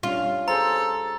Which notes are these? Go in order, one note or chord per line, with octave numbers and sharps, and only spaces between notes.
G3 C#4 D4 F4
G#4 A4 C5 A#5